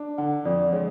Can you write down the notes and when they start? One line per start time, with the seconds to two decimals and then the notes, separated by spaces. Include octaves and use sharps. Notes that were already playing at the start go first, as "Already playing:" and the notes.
Already playing: D4
0.18 D3 F#5
0.45 F2 D5
0.72 G#3 C#5